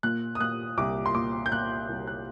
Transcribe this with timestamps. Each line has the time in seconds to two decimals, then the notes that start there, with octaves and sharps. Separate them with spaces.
0.03 A#2 F#6
0.35 D#6
0.40 A#2 F#6
0.78 C2 D6
1.06 C6
1.14 A#2 D6
1.46 G6
1.52 A#2 F#6
1.89 C2
2.07 F#6